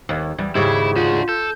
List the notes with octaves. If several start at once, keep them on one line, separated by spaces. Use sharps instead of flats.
D#2
E2 G3
D#2 G#2 C#3 E4 G4
D4 F4 F#4
A4 G6